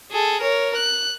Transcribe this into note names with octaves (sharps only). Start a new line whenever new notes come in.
G#4 A4
A#4 C#5
F#6